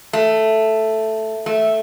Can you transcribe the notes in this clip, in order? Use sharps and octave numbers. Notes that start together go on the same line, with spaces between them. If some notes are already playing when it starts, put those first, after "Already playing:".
A3
A3